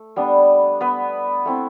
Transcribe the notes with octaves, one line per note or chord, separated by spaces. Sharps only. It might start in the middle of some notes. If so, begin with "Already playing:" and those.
Already playing: A3
G3 B3 D4
B3 B4
A3 C4 E4